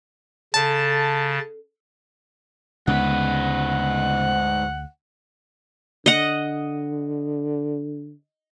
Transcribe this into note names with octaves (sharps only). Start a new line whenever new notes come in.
C#3 C#4 A4 A5
D2 G#2 C#3 G#3 B3 B4 F#5
D3 D#5 F#5